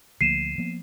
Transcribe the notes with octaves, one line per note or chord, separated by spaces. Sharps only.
D2 F3 A#3 C7 D#7 E7
F3 A#3 B3